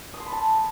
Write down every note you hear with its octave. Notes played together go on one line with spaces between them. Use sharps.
D#6
C6
B5
A5